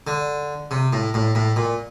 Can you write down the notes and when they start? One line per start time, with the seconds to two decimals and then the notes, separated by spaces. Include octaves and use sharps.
0.07 D3
0.71 C3
0.93 A2
1.14 A2
1.35 A2
1.56 A#2